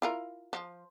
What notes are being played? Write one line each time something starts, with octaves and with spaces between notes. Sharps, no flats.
E4 F4 A#4
F3